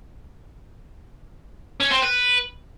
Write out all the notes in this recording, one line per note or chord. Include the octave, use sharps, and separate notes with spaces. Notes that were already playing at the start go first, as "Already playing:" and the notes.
C#4
C4
B4